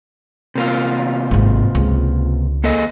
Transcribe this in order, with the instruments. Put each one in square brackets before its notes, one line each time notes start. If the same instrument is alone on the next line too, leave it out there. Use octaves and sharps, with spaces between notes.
[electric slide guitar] C3 A#3 F4
[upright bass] G#1 C4
C#2
[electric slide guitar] A#3 A4 D#5